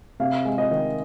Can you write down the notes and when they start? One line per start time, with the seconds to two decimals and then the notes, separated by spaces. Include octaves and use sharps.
0.20 C3 F5
0.45 G#3
0.58 D#5
0.71 D#3